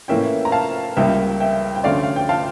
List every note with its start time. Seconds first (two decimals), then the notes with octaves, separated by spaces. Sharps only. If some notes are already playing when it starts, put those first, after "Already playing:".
0.08 A2 E3 A#3 C#4 E5 G5
0.45 A#5
0.52 F5 A5
0.97 C#2 C#3 G3 A#3 E5 G5
1.40 E5 G5
1.75 G5
1.84 D2 D3 A3 C#4 D5 F5
2.03 F5
2.16 G5
2.29 F5 A5